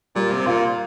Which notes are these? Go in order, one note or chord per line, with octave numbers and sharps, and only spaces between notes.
A#2 G3
C3
A#2 F4